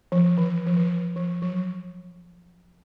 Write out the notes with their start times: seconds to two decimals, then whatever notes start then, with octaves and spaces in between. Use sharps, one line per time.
0.12 F3
0.38 E3
0.67 F3
0.77 E3
1.16 F3
1.42 F#3